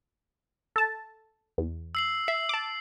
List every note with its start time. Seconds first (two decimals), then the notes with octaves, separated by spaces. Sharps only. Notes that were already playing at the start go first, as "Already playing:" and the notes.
0.76 A4 A5
1.58 E2
1.95 E6 C7 F#7
2.28 E5 C7
2.49 A5 D6